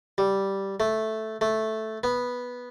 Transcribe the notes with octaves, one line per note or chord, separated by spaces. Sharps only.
G3
A3
A3
B3